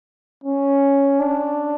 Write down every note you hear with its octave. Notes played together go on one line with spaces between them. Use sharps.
C#4
D4